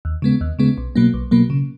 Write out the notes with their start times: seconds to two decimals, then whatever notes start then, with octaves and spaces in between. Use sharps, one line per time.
0.05 D#2
0.22 C#3 G#3 B3
0.41 D#2
0.59 C#3 G#3 B3
0.78 B1
0.96 B2 F#3 A#3
1.14 B1
1.31 B2 F#3 A#3
1.50 C#3